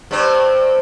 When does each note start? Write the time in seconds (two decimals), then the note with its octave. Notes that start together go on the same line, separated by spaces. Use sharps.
0.11 G2 C4